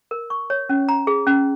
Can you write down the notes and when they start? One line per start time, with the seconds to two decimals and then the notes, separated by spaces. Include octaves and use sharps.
0.11 A#4
0.30 C#6
0.50 C#5
0.69 C#4
0.89 A#5
1.07 G#4
1.27 C#4